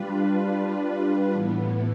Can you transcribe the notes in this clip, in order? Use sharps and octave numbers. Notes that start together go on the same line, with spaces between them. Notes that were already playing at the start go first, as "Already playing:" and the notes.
Already playing: G3 D4 F4 B4
A2 E3 B3